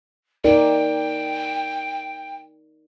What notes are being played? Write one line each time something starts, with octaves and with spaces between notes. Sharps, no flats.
D#4 A#4 D5 G5